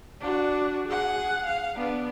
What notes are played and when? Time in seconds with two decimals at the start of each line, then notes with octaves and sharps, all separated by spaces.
0.21 D4 F#4
0.89 G#4 F#5
1.46 F5
1.77 B3 D4